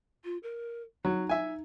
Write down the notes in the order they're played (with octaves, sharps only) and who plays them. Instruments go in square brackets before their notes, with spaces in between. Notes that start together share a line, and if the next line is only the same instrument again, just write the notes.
[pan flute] F4
A#4
[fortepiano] F#3 [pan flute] D#4
[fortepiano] E5 G#5